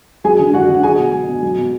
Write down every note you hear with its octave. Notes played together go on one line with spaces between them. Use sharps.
F#3 G#4 G#5
D3
F#3 F#4 F#5
D3
F#5
F#3 G#4 G#5
B2
F#3
B2
F#3
B2